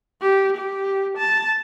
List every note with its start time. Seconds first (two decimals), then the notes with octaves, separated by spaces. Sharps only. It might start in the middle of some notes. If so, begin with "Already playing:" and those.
0.21 G4
0.57 G4
1.17 A5